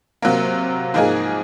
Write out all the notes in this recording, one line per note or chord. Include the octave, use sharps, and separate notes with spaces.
C3 F#3 A#3
G#2 F3 A#3 D#4 G#4